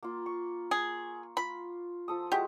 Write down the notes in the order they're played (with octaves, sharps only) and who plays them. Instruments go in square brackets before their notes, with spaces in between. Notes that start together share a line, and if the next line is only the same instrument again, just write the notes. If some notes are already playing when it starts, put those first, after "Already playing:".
[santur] A#3 F4
C#6
[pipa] G#4
[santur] F4 [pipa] B5
[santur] F3 A4 D#6
[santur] G#3 E4 F#4 [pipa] G4